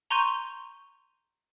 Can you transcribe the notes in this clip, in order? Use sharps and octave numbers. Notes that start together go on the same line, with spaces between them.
A#5 C6 C#6 G6 D#7 G7